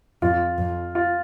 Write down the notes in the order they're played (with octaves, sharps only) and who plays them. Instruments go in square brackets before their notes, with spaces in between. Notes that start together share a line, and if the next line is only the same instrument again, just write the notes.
[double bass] F2 [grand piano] F4
[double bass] F2
[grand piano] F4